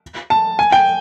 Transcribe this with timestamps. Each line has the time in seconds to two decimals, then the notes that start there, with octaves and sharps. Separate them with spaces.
0.30 A5
0.59 G#5
0.72 G5